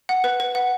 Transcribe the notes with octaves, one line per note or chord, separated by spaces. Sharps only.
F#5
B4
B4
F#5